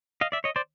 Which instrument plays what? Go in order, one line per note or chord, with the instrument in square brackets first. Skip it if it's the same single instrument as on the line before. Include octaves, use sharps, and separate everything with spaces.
[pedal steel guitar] D#5 F5
D5 E5
C#5 D#5
C5 D5